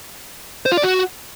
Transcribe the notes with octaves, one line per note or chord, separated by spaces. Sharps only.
C5
F4
D5
F#4